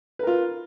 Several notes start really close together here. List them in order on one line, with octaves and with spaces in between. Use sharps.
B4 A#4 F4